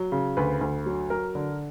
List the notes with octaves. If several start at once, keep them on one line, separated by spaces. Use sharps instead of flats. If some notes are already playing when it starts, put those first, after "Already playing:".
Already playing: F#3
C#3
D2 B4
D2
F#3
F#3 A#4
D3